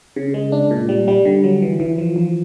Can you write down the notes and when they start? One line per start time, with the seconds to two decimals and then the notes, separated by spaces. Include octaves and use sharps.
0.16 C#3
0.34 G#3
0.52 D4
0.71 A#2
0.89 G3
1.08 G3
1.25 D3
1.44 F#3
1.62 E3
1.80 E3
1.98 F3
2.16 F3